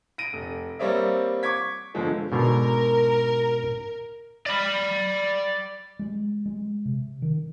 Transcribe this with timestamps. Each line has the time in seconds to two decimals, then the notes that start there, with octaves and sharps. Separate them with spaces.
0.18 A#6 D7 D#7
0.33 F1
0.79 G3 A#3 C4 C#5 D5 E5
1.43 C#6 D6 G#6 B6
1.94 G1 D3 F3 G#3 A4
2.32 G#2 B2 D3 A#4
4.46 D5 B5
5.99 G#3
6.46 G#3
6.86 C3
7.22 D#3